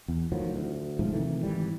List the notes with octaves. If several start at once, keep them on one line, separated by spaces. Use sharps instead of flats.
E2
A2 D#3 F3 F#3
D2
B1 G#2 F3 A3
C3 D#3 E3 A3
G#1 E3 G3